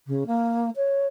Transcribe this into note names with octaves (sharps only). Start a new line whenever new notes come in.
C#3
A#3
C#5